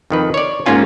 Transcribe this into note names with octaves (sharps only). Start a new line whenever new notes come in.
F2 D#3 B4
C#5 D5
G#2 A#3 C#4 F4 G#5